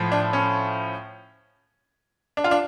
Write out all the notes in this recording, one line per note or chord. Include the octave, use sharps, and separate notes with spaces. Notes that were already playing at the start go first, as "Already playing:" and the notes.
Already playing: A2 F3
D4
C#4
D4
F4
D4